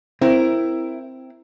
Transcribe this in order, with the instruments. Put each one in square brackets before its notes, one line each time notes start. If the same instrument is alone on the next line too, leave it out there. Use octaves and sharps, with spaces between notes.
[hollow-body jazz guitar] C4 [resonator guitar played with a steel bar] E4 A#4